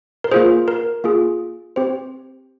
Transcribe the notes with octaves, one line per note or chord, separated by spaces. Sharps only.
A#4
A#3 F4 G#4 C5
A#4
A#3 F4 G#4
C4 G4 C5